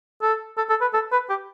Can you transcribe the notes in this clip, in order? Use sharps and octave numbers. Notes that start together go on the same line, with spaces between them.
A4
A4
A4
B4
A4
B4
G4